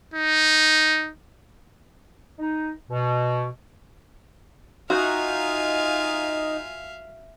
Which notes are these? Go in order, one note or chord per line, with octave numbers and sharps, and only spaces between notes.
D#4
D#4
B2
D#4 F4 F#4 E5 F5 G#5